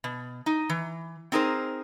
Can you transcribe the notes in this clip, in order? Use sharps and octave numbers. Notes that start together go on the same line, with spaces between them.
B2
D#4
E3
C4 D#4 G#4 A#4 C5